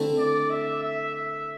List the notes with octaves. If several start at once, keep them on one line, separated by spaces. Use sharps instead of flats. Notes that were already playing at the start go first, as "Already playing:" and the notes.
Already playing: D3 A3 C4 E4
D5
E5
E5
E5